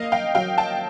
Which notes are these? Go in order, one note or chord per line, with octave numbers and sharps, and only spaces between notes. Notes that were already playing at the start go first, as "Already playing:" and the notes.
Already playing: A#3 D#5 F5
F5 G5
F#3 F5 G5
G5 A5